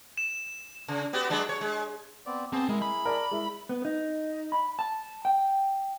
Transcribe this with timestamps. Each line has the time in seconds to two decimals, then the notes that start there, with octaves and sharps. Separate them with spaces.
0.17 E7
0.88 C#3
1.13 B3 F#4 G4
1.30 F#3 G#3 D4
1.49 C#5
1.61 G#3
2.26 B3 C4 D5
2.53 B3 C4 G#4 A5
2.69 G#3 E4 G#4 A#4
2.82 B5
3.05 A#4 D5 A5
3.31 G#3 E4
3.69 B3
3.85 D#4
4.52 B5
4.79 A5
5.25 G5